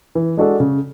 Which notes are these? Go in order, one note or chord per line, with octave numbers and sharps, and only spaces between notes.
E3
G#3 D4 F#4 A4
C#3